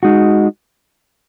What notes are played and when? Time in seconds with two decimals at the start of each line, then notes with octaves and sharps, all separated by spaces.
0.03 G#3 D#4 F#4